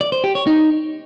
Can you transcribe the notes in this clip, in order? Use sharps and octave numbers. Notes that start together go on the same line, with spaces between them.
D5
C5
G4
C#5
D#4